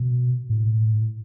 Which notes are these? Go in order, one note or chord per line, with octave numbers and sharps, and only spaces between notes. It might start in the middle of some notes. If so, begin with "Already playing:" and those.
Already playing: B2
A2